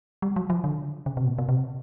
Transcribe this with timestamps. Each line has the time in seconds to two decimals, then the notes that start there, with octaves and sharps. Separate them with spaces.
0.22 G3
0.36 F#3
0.50 F3
0.64 D3
1.06 C#3
1.17 C3
1.24 B2
1.27 A#2
1.38 B2
1.49 C3